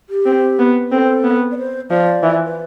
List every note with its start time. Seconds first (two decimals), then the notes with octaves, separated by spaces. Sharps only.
0.10 G4
0.26 C4
0.59 B3
0.91 C4 A4
1.24 B3
1.52 D5
1.58 C5
1.90 F3 D5
2.23 E3
2.46 B4